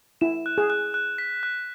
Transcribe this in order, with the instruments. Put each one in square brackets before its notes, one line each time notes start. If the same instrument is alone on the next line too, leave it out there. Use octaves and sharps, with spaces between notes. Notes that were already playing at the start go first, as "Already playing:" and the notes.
[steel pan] E4 [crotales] E7
[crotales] F#6
[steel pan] G#4
[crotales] F#6
F#6
B6
F#6